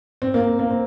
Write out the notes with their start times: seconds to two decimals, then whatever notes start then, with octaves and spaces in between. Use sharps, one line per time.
0.22 C4
0.34 A#3
0.59 A#3
0.71 C4